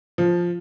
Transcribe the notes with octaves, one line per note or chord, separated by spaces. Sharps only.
F3